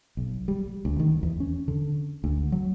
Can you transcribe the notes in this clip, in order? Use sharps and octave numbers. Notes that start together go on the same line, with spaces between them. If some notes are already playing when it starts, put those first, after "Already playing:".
B1
G3
D2
D#3
E2
C#4
D3
D2
F#3